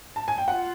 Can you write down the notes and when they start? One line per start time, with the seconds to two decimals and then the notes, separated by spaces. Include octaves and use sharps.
0.16 A5
0.28 G#5
0.38 G5
0.48 F4 F#5